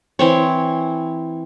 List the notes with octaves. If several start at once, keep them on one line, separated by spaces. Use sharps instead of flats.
E3 C4 C#5